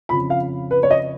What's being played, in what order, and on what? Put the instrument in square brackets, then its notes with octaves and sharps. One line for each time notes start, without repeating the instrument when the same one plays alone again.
[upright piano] F2 C#3 F3 B5
F5
B4
C#5
D#5